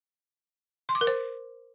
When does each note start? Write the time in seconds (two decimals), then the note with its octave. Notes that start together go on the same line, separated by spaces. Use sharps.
0.89 C6
0.95 D6
1.01 A#4
1.07 C5